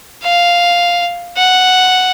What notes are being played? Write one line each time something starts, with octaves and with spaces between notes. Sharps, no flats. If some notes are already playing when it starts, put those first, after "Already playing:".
F5
F#5